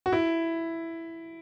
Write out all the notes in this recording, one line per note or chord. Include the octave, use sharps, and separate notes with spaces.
F#4
E4